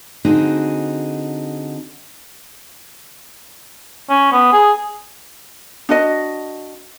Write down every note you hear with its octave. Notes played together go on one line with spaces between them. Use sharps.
D3 C4 D#4 F#4 G#4
C#4
B3
G#4
D4 F#4 D#5